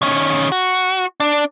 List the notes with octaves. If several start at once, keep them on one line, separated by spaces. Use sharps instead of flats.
D#3 C#4
F#4
D4